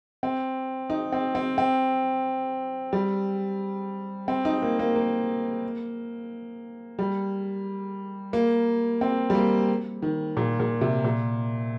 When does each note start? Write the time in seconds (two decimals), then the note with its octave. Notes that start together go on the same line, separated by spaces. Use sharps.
0.23 C4
0.90 D#4
1.12 C4
1.35 C4
1.58 C4
2.93 G3
4.28 C4
4.45 D#4
4.62 A#3
4.79 A#3
4.96 A#3
6.99 G3
8.33 A#3
9.01 C4
9.30 G3
9.35 A#3
10.02 D#3
10.37 A#2
10.60 A#2
10.81 C3
11.04 A#2